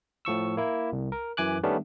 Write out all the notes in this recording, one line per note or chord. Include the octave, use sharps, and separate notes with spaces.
A2 F3 C#6 E6
A#3 E4
C2
A#4
F#2 E3 G#5 D6 F#6
D#3 G3 A3 B3 C#4 D4